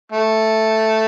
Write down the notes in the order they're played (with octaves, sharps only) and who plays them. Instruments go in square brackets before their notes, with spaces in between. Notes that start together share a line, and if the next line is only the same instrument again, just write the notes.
[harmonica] A3